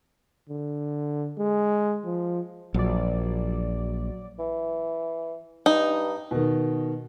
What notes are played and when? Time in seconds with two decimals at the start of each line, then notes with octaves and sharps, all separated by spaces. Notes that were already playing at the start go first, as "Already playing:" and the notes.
0.50 D3
1.39 G#3
2.05 F3
2.74 A#1 F#3 D5
4.39 E3
5.66 G2 D#4
6.31 B2 D#3